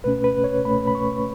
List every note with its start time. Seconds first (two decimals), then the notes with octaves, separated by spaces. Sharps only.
0.04 C#2 B2 A3 C#4 B4
0.24 B4
0.44 C#5
0.64 C#2 B2 A3 C#4 B5
0.87 B5
0.95 C#6